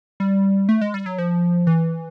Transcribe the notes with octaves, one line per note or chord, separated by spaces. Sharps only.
G3
A3
G#3
G3
F#3
F3
E3